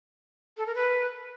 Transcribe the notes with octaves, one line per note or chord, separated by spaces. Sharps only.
A4
A#4
B4